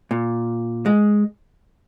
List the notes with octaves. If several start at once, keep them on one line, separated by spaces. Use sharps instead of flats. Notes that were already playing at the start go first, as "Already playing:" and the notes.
A#2
G#3